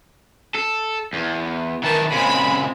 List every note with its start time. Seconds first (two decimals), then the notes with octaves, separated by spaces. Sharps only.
0.55 A4
1.14 E2
1.83 D#3 E3 A#4 A5
2.12 A#2 C#3 G#3 C4 B5